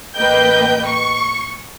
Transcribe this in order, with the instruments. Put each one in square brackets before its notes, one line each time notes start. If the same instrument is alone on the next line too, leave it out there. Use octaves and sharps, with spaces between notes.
[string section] A1 A#3 B4 D#5 G5 G6
C#6